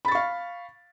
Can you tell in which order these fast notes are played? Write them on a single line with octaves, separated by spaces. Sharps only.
B5 A6 C#6 F5